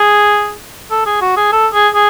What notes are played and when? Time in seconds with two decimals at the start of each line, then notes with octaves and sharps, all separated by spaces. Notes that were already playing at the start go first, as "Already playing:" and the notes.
Already playing: G#4
0.91 A4
1.06 G#4
1.21 F#4
1.37 G#4
1.52 A4
1.74 G#4
1.94 G#4